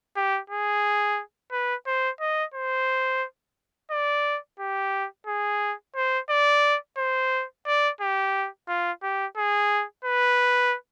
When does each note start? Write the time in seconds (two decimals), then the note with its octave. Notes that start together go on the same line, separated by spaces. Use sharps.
0.16 G4
0.50 G#4
1.52 B4
1.87 C5
2.21 D#5
2.54 C5
3.91 D5
4.60 G4
5.27 G#4
5.96 C5
6.30 D5
6.98 C5
7.67 D5
8.01 G4
8.68 F4
9.03 G4
9.37 G#4
10.05 B4